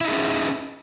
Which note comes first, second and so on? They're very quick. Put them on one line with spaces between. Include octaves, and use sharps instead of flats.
E4 D#4 G#4 C#4